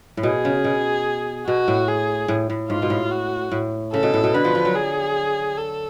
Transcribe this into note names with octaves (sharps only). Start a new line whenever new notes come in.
A2
B2 G#4
C#3
B2
B2 F#4
A2
G#4
A2
A2
G#2 F4
B2
A2
F#4
A2
C#3 A4
B2
A2
B2
D3 B4
F3
F3
F#3
G#4
A4